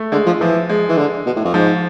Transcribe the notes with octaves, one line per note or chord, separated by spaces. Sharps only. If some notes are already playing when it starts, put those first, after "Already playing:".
Already playing: A3
D3 G#3
F3
E3 F3
G#3
E3
D3
B2
A2
F2
G#2 F3